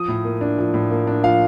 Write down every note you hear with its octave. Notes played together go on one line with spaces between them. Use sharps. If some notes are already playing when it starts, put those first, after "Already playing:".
Already playing: F3 D#6
A2
A#3
D4
F3
A2
A#3
D4
F3 F5